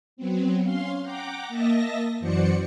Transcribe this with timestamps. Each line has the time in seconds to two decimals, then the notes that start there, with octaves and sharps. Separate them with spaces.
0.17 F#3 B3 C4
0.62 C#4 F5 C6
1.02 F#5 G5 A#5 D6
1.48 A#3 D#5 E5 A5 A#6
2.20 F#2 E3 F#4 C5 D5 C#7